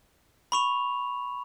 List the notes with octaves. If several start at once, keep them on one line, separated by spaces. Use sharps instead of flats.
B5 C#6 F7